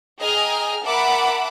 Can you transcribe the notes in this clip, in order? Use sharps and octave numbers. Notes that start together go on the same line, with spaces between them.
G#4 D#5 G5 G#5 A#5 F6
A#4 E5 F#5 A5 B5 D6